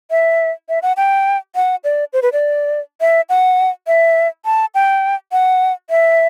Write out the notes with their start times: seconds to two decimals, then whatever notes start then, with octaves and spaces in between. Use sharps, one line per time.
0.11 E5
0.69 E5
0.83 F#5
0.97 G5
1.55 F#5
1.84 D5
2.13 C5
2.22 B4
2.33 D5
3.01 E5
3.29 F#5
3.87 E5
4.45 A5
4.75 G5
5.32 F#5
5.90 E5